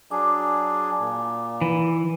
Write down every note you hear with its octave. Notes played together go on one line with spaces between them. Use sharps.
F#3 D4 G#4 D6
A#2
E3